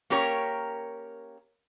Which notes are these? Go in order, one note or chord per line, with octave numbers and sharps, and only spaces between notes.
A#3 C#4 G4 A#4 C#5